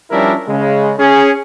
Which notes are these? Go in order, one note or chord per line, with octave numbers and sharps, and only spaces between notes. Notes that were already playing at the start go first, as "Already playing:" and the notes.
F3 G3 C#4 D4 E4 A#4
C#3 G#3
C#4 G#4